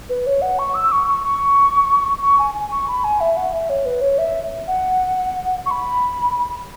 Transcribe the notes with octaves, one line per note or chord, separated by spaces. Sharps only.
B4
C#5
F#5
C#6
E6
C#6
C#6
C#6
C#6
G#5
G#5
C#6
B5
G#5
E5
F#5
E5
C#5
B4
C#5
E5
F#5
C#6
B5